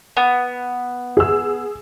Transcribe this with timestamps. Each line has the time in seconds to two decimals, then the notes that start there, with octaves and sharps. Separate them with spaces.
0.17 B3
1.17 G#4 E6